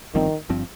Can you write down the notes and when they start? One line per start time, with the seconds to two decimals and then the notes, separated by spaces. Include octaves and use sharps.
0.15 G1 G2 D#3 F3 C4
0.49 G1 G2 F3 C4